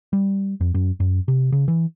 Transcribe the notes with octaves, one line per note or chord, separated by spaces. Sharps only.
G3
F2
F#2
F#2
C3
C#3
E3